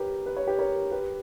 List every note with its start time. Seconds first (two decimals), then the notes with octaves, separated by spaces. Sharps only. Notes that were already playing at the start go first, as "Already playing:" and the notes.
Already playing: G4 A#4 B4 C#5
0.26 B4
0.37 C#5
0.47 G4 B4
0.59 A#4 C#5
0.92 G4 B4